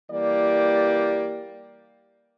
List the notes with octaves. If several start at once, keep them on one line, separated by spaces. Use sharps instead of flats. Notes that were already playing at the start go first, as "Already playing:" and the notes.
E3 G3 A#3 G4 D5